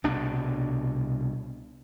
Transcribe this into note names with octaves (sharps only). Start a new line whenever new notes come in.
C2 B2 D4